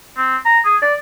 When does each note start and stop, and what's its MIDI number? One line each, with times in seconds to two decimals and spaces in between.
0.17 0.37 60
0.45 0.59 82
0.65 0.77 68
0.82 0.94 74